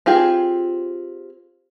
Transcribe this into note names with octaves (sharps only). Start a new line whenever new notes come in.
C4 F4 G4 G#4